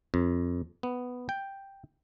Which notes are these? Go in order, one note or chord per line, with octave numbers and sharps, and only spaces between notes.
F2
B3
G5